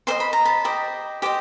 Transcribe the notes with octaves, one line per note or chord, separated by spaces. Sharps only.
G4 C5 D#5 C6
B5
A#5
A5 B5
G4 C5 D#5
G4 C5 D#5